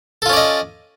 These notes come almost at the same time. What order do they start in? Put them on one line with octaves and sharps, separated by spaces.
A4 F4 C#4 D5 D#5